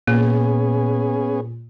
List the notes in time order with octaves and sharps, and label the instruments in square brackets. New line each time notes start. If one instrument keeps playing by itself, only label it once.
[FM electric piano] A#2 [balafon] A#3 [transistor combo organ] B3 C#4 G#4